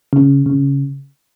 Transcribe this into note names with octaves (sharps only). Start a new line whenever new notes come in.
C#3
C#3